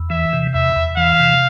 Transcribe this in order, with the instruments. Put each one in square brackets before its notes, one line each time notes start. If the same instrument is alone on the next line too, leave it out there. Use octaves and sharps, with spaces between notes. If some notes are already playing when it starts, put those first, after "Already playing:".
Already playing: [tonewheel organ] E2
[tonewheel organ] E3 [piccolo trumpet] E5
[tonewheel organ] C3
[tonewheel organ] E2 [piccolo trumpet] E5
[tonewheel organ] E2
[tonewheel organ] E3 [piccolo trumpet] F5
[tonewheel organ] C3